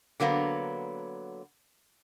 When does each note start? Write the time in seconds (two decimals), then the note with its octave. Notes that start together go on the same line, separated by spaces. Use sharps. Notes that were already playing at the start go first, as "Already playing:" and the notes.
0.20 D3 F#3 A#3 B3